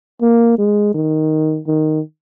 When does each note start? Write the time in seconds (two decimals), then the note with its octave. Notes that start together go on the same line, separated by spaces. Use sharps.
0.22 A#3
0.58 G#3
0.94 D#3
1.67 D#3